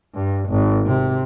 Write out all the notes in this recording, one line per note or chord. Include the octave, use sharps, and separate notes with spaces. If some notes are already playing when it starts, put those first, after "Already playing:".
G2
G#1
C3